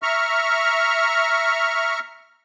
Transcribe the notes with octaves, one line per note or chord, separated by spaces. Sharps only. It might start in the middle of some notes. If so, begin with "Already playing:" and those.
E5 A#5 C#6 F6